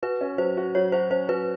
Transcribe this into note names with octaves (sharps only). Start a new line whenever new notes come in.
F#4 B4
C#4
F#3 C5
F#4
F#3 C#5
F#4 C5
C#4 C5
F#3 B4